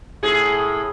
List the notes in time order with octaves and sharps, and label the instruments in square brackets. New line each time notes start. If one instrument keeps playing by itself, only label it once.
[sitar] A2 G#4